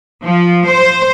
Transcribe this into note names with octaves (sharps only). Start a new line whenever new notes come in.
F3
C5